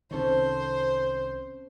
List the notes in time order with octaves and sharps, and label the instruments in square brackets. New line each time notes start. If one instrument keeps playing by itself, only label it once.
[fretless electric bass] C2 D#3 [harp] C4 C#4 A4 [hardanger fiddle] C5